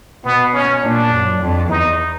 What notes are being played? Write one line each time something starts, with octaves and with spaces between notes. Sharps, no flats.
B2 B3
C#4
A#2 D4
F#2
F2
E2 D#4